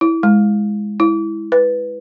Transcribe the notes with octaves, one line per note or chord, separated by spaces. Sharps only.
E4
G#3
E4
B4